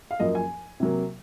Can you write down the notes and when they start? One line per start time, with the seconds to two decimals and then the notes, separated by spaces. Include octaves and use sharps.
0.11 F5
0.20 F#2 F3 A#3 D#5
0.35 G#5
0.80 C3 F#3 A#3